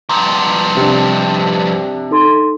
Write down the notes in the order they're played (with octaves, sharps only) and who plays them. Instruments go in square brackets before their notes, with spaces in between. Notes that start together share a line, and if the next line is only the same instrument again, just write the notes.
[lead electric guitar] G2 F3 [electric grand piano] A#5
[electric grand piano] C3 D4
[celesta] D#4 A4 C6